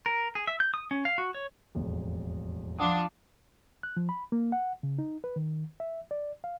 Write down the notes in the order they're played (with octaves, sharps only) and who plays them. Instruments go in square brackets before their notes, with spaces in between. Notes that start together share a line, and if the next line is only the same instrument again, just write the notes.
[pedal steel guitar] A#4
G#4
E5
G6
D#6
C#4
F5
F#4
C#5
[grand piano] E1 A1 F2
[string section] F3 D4 F4 [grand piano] F#5 A5 D#6
[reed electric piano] F#6
F3
B5
A#3
F#5
C#3
D#4
B4
D#3
E5
D5
F5